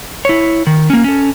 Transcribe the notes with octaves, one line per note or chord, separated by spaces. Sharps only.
E4 C#5
D#3
A#3 C#4
C#4 A4